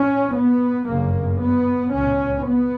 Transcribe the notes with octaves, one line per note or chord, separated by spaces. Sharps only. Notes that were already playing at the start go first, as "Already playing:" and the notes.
Already playing: C#4
B3
G1 F#2 C#3 A#3
B3
C#2 B2 C#4
B3